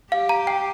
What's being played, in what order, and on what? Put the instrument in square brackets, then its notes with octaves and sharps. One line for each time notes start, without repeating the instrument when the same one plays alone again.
[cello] G4 [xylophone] F5
[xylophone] A#5
G5